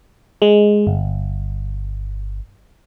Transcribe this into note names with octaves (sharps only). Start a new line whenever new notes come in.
G#3
G1